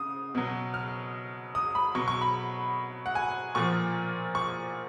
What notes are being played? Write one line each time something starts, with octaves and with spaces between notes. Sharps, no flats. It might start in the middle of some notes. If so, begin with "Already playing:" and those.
Already playing: C#3 D#6
B2 F#3
F6
D#6
B5
B2 F#3 C#6
C#6
B5
F#5
G#5
A#2 F3 C#6
C#6